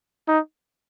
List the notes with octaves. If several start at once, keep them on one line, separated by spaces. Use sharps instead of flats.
D#4